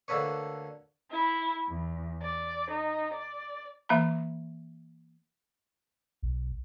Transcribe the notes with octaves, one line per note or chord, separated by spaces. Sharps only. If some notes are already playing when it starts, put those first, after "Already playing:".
D2 D3 A#3 A4 B4 C#5
E4
E2
D5
D#4
D5
E3 A#3 E5 A#5 B5
B1